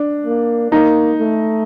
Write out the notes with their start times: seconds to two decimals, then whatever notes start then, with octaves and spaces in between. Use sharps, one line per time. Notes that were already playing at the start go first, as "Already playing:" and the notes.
Already playing: D4
0.25 A#3
0.71 A#3 D#4
1.19 A3